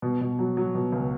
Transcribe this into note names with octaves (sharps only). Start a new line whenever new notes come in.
B2
B2
F#3
F#3
B2
C#2